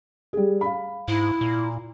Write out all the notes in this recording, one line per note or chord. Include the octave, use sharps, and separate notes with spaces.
G3 G#4
F5 B5
G#2 E4
A#2